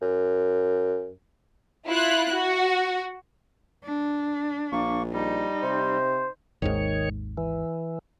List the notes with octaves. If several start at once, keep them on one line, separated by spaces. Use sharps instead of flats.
F#2
E4 F4 F#6
F#4
D4
A#1 A#3 C#6
G3 D#4
C3 C5
G#1 D#2 G#2 D#3 C#5
E3